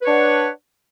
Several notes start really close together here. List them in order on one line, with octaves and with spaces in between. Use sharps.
B4 C#5 D4 F#5